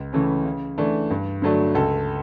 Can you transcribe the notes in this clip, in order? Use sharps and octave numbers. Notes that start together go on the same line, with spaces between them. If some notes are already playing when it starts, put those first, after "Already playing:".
Already playing: C#2
C#3 E3 A3 C#4
C#3
E3 A3 D4
G2
D3 F#3 A3 D4
C#2 A4